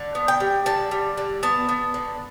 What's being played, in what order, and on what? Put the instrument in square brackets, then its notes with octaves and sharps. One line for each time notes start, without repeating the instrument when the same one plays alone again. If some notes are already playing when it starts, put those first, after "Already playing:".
Already playing: [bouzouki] D3
B3
G5
G3
D3 A5
G3
D3
B3 A5
B3
D3